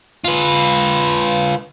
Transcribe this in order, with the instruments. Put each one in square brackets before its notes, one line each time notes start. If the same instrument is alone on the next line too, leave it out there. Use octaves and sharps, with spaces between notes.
[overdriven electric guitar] F4 B4